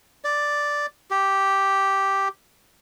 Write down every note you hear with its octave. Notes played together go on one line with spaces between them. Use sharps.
D5
G4